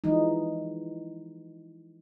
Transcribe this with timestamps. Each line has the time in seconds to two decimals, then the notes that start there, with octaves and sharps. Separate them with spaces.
0.04 E3 F3 G#3 D#4